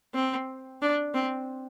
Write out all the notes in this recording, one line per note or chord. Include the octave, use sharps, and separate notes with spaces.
C4
D4
C4